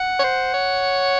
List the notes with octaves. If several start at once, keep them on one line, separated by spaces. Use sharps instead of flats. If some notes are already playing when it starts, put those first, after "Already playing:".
Already playing: F#5
C#5
C5
C#5